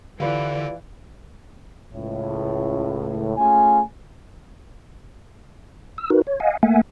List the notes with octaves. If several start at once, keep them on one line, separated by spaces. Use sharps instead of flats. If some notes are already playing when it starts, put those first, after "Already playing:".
D3 E3 F4 G4 B4 D5
C#2 A2
A3 C#4 F4 G#4 G#5
E6
D#4 F#4 A#4 B4
C#5
D#5 F5 F#5 G#5
A3 A#3 E5 F#5 G#5